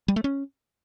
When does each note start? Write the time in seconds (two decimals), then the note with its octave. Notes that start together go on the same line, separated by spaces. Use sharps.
0.08 G3
0.16 A3
0.24 C#4